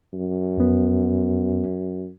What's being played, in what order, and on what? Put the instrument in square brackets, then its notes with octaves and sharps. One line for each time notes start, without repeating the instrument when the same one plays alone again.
[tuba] F#2
[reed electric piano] F2 B3